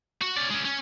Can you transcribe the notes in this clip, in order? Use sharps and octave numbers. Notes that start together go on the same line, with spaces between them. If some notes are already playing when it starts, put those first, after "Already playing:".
F#4
C#4 D5
G#3 C#4
C#4